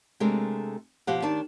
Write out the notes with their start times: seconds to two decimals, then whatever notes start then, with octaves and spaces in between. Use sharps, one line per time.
0.20 C3 G#3 A3 D4 A#4
1.07 B2 F3 G4 F5 F#5
1.22 D#3 D4 D5 A5